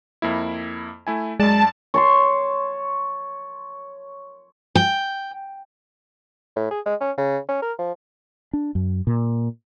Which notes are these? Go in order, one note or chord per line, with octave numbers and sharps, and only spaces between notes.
F2 A#3 E4
A3 E4 G#5
F#2 G#3 D5 A5
C#5 A5 C6
G5
A2
G#4
G#3
C#4
C#3
C#4
A#4
F3
D4
F#2
A#2